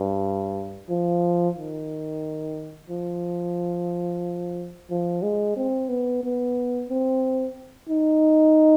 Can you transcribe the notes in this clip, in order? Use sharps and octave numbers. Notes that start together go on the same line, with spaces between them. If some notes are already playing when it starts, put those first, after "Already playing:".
Already playing: G2
F3
D#3
F3
F3
G#3
C4
B3
B3
C4
D#4